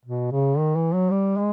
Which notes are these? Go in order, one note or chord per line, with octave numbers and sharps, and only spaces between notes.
B2
C#3
D#3
E3
F#3
G3
G#3